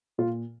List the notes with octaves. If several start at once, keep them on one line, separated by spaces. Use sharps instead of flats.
A#2 F4